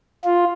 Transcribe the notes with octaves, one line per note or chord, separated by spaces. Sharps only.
F4